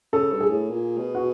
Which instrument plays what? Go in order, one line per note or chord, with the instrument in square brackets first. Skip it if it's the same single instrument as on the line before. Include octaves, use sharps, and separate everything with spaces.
[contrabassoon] C#3 [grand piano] A4
[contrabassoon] G2
[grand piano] G#4
[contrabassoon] A2
A#2
B2
[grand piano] F#4